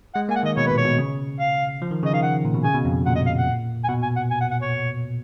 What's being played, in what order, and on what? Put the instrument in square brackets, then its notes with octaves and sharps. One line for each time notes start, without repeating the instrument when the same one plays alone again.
[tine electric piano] G#3 [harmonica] F#5
[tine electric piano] A#3 [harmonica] G#5
[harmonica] F#5
[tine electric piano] D#3 [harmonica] D#5
[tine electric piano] B2 [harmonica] C#5
[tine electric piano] A#2 [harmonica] B4
[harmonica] C#5
[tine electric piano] B2
C#3
[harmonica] F5
[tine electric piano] F3
D#3
[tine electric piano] C#3 [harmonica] D#5
[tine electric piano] D#3 [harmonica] F5
[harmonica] F#5
[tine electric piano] A#2
B2
[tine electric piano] C#3 [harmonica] G#5
[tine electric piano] B2
F2
[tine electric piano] A#2 [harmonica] F#5
[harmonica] D#5
F5
F#5
G#5
[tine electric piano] B2 [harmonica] F#5
[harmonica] G#5
F#5
G#5
F#5
F#5
C#5